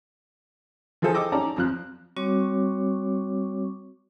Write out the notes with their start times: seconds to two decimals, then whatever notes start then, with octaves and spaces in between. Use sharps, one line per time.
1.02 E3 F3 G#4 A4 C5
1.14 D#5 G5 D6 E6
1.32 C#4 D#4 D5 A5 A#5
1.56 F2 F3 F#6
2.16 G3 C4 F#4 C#5 C#6 D6